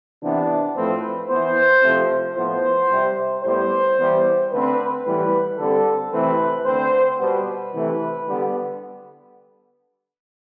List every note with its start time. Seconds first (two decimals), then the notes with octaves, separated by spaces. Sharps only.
0.22 C3 E3 B3 D4
0.76 A2 F3 A3 C4 B4
1.29 E3 B3 C5
1.83 C3 F3 A3 C4
2.36 A2 F3 B3 C5
2.90 C3 G3 C4
3.44 A2 G3 B3 C5
3.98 E3 G3 B3
4.51 D3 A3 C4 B4
5.05 A2 E3 G3 B3 B4
5.58 D3 G3 C4 A4
6.12 C3 E3 A3 C4 B4
6.66 D3 A3 C4 C5
7.19 B2 G3 B3 B4
7.73 C3 E3 A3
8.27 D3 G3 B3